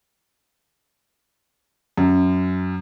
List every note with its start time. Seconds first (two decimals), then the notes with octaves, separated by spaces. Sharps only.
1.98 F#2